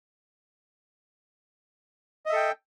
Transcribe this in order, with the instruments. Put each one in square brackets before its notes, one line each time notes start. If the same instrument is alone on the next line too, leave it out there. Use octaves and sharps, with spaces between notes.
[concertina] D#5
E5
A4
G5